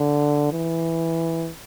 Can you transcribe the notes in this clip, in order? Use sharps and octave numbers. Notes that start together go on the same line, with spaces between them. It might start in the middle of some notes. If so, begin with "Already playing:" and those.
Already playing: D3
E3